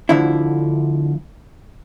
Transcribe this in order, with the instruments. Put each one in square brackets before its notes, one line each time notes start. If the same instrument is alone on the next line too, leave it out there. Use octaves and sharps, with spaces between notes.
[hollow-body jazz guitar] D2 D3 F3 E4